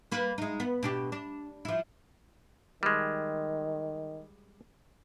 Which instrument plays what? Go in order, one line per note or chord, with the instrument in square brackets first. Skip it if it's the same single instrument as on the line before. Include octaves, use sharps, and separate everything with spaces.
[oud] A#3 B4
G#3 D#4
B3
B2 D4 G4
D4
F3 E4
[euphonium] D#3 [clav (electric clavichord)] G3 G#3